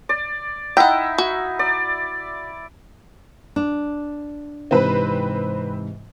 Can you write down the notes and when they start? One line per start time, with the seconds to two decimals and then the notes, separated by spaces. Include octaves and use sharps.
0.09 D5
0.77 D#4 E4 E5 F#5 G5
1.18 F#4
1.59 D5
3.56 D4
4.71 G#2 C3 E3 C4 B4